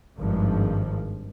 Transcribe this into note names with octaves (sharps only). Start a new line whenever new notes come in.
G#1 G2 F3